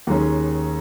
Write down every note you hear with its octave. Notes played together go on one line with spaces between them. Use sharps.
D#2 D#3 G#3 C#4